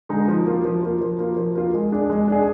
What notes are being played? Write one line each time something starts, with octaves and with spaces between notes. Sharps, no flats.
D3 G#3 D#4
F3
A#3 F4
F3
A#3 F4
F3
A#3 F4
F3
A#3 F4
G#3
D4 G#4
G#3
D4 G#4